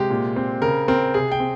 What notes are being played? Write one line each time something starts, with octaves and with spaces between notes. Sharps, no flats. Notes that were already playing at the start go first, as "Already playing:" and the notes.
Already playing: C3 G#3 G4
A#2
C4
C#3 A#4
C4 A#4
C3 G#4
G5
C4